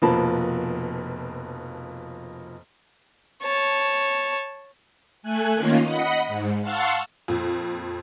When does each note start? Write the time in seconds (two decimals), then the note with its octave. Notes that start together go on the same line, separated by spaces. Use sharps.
0.02 F1 B2 F3 A#3 A5 B5
3.43 C#5 A5
5.23 A3 G#5 F#6
5.54 D#3 A#3 C#4 F4
5.85 D#5 F#5 B5 C#7
6.27 G#2
6.62 F5 F#5 A5 C6 C#6 E6
7.28 F2 A#2